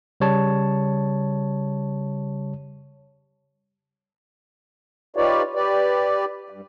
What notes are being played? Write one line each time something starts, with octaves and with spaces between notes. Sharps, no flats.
C#3 G3 C#5 A5
D#4 F4 G4 B4 C#5 D5
G4 B4 D5
G2